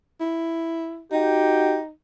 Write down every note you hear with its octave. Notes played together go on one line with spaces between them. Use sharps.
E4
D#4 F#4 G4 G5